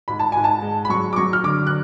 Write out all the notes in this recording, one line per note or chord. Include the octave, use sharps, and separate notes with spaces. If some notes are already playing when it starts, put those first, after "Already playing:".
G#2 B5
A5
G#2 G#5
A5
G#3
B5
F#3 C#6
D6
F#3 C#6
F6
D3 D6
F#6